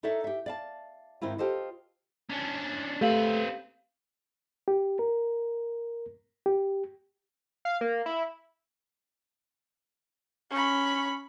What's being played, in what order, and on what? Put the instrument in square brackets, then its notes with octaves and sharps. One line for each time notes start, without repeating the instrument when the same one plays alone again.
[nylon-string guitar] D#4 A4 A#4 C#5 D5 E5
G4 E5
D5 F5 A5
G#2 D#3 C4 E4 F4
F4 G4 A4 C5 D#5
[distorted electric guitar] C#4 D4
[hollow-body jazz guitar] A3 [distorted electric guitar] C4 B4 [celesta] G4 F5 F#7
[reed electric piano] G4
A#4
G4
[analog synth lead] F5
A#3
E4
[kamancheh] C#4 B5